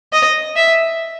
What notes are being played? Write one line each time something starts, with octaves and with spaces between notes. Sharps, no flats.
D#5
E5